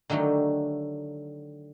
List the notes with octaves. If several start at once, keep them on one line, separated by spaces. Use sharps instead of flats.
D3 D#3 F#3 A3 G4